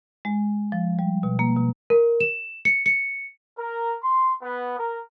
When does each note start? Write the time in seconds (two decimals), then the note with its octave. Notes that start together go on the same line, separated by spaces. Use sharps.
0.25 G#3
0.72 F3
0.99 G3
1.23 B2
1.39 A#3
1.57 B2
1.90 A#4
2.20 E7
2.65 C#7
2.86 C#7
3.59 A#4
4.03 C6
4.43 B3
4.78 A#4